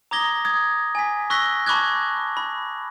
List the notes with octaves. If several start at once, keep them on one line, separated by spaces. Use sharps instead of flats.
A#5 D6 D#6 G#6 A#6 G7
D#6 G#6
G#5 B6
C#6 E6 F#6 A#6 B6 G7
A5 B5 C#6 D6 F#6 G#6
B5